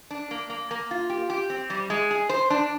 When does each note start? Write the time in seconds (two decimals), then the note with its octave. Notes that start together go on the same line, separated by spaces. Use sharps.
0.11 D4
0.31 A#3
0.50 A#3
0.71 A#3
0.91 F4
1.10 G4
1.30 G4
1.50 C4
1.70 G3
1.90 G#3
2.11 G#4
2.29 C5
2.50 D4